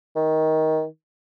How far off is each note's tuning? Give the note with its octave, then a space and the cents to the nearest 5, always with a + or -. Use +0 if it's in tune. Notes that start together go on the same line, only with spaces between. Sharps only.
D#3 +15